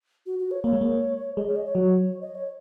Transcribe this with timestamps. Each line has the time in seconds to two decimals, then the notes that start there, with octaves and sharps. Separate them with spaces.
0.26 F#4
0.39 F#4
0.51 C#5
0.63 A#3 C#5
0.73 G#3
0.81 A#3
1.37 G#3 D#5
1.48 C#5
1.56 D#5
1.66 C#5
1.75 F#3
2.21 D#5
2.35 C#5